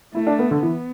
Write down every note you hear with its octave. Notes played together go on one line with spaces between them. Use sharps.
A3 E4
D4
B3
D3
E3 B3